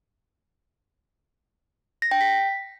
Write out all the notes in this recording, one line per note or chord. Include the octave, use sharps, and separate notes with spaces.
A#6
G5
B6